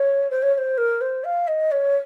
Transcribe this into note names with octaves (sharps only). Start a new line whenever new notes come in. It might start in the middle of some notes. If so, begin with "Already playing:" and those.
Already playing: C#5
C5
C#5
C#5
C5
A#4
C5
F5
D#5
C#5